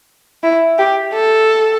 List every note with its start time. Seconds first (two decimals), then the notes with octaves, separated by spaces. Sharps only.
0.43 E4
0.79 G4
1.14 A4